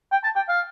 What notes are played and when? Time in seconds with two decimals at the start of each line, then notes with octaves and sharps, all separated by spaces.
0.12 G5
0.23 A5
0.36 G5
0.49 F5